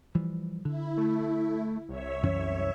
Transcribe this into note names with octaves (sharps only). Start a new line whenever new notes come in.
E3 F3 G3
D3 E4
A3
C2 C#5 E5
F#2 E3 C#4